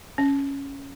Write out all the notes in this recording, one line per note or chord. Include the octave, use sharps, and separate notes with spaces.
C#4